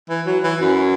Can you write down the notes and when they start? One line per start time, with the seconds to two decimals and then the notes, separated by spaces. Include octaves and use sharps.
0.09 E3
0.26 F#3
0.43 E3
0.61 F#2